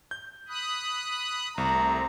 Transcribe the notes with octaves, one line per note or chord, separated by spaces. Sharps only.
G6
B5 D#6 F#6
C2 C3 A3 C4 A#5